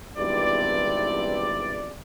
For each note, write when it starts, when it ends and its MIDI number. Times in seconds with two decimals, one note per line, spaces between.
0.17 1.97 32
0.17 1.97 40
0.17 1.97 43
0.17 1.97 48
0.17 1.97 64
0.17 1.97 74